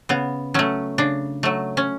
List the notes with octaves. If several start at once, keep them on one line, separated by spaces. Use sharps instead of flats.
C#3 B3
F#3 A3 C#4
C#3 D4
F#3 A3
C#4